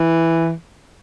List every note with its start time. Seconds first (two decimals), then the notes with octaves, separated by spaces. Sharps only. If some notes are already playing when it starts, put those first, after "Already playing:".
Already playing: E3